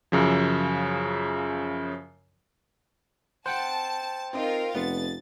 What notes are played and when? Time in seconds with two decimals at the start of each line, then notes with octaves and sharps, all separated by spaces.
0.12 F#2 C#3 F3
3.46 C5 F#5 G5 A5 C#7
4.33 C4 D#4 F4 A#4
4.75 F1 B3 A6